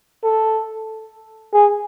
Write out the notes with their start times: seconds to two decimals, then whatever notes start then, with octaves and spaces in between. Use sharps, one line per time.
0.23 A4
1.53 G#4